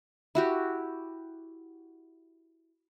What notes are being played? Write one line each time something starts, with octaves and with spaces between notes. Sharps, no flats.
E4 F#4 G4